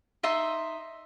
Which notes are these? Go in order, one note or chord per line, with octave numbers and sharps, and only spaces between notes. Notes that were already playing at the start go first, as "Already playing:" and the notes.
D#4 D#5 E5 C6